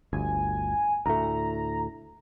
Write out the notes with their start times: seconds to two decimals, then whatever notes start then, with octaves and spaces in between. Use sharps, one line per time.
0.13 G1 D2 G#5
1.06 D2 A2 A3 A#5